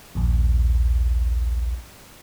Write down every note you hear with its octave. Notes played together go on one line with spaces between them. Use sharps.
A#1 D#2